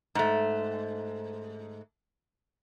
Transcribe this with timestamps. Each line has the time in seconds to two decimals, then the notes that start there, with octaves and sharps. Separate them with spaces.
0.15 G#2 A3